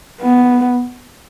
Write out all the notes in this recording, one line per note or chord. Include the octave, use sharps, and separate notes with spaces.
B3